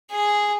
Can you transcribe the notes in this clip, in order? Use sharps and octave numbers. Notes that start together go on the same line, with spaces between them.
G#4